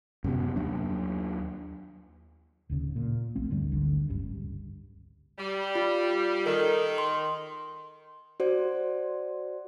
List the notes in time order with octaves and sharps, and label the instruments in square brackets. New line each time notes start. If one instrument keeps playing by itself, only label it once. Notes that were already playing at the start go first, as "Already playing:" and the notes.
[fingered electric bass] F#2 C3 B3
D#2 F#3 D4
[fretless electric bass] D1 D#2 C#3
A#2
A#1 A3 C4
D1 D2 G2 G3
G#1 D2 D3
F#1 C#2 G2
[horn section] G3
[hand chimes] F4
[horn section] D#3 [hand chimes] A4 A#4
[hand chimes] C6
F#4 C5 D5